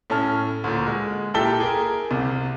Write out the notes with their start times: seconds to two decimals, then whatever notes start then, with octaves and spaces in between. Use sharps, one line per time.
0.10 A2 C#4 A5 F6
0.64 D2 A#2
0.87 G#3
1.34 A#2 E4 G4 A4 E5 G7
1.60 G#4 A#4
2.11 C2 C3